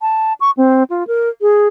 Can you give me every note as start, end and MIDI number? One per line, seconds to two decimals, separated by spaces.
0.02 0.33 81
0.40 0.51 85
0.57 0.83 60
0.90 1.07 65
1.07 1.29 70
1.41 1.68 68